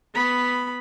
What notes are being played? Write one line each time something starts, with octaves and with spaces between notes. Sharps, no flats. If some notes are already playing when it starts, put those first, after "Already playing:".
B3 B5